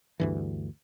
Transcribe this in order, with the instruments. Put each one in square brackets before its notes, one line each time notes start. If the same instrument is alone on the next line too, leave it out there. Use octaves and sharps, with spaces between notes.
[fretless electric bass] D2 G2 E3